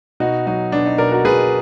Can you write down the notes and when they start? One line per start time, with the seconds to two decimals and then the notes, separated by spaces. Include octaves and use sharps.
0.20 B2 D#4 F#4
0.47 F#3 D#4
0.72 B2 D4
0.86 D#4
0.98 B2 A#4 D5
1.12 F#4 A#4
1.25 B2 G#4 B4